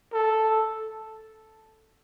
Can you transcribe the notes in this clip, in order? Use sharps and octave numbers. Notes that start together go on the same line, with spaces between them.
A4